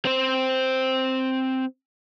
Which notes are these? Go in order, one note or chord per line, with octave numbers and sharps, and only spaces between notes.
C4 C5